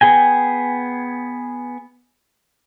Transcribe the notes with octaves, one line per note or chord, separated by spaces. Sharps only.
B3 G#4 G5 G#5